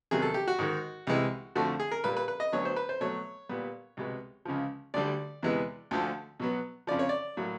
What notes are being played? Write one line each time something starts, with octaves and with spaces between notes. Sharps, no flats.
E2 C3 D#3 F#3 G#4
A4
G4
F#4
G#2 D#3 G#3
C2 C3 E3 G#3
F2 D3 F3 A3 F#4
G#4
A#4
A#2 G3 A#3 B4
B4
B4
D#5
D2 D3 F#3 B3 C#5
C5
B4
C5
B2 F#3 A3 C#5
A#2 G3 B3
C2 B2 G#3 B3
C#2 C#3 F3
D2 D3 G3 D5
E2 C3 E3 G#3 B3
D2 D3 F3
B2 F#3 B3
F2 C#3 F3 D5
C#5
D5
A2 F#3 A#3